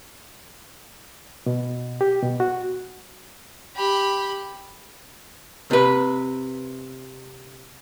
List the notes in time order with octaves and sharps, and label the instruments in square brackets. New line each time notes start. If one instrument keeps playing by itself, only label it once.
[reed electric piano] B2
G4
B2
F#4
[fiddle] G4 B5
[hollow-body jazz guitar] C3 B4